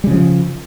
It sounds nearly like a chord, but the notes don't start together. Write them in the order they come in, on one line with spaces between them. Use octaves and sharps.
G3 C#3 F3